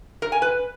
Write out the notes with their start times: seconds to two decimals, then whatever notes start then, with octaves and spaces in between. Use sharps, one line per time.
0.22 A#4
0.32 G#5
0.42 B4